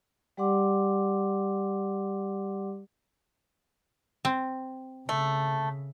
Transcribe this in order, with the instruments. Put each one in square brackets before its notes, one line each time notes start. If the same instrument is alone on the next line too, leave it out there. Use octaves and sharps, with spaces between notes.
[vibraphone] G3 G4 D5 F#5 C6 D6
[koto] C4
[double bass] C#3 [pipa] A3